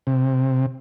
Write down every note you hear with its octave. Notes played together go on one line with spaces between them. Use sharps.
C3